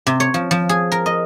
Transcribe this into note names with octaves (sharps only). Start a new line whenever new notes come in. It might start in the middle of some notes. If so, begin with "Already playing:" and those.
C3
C#5
F3
F3
G#4
A#4
D#5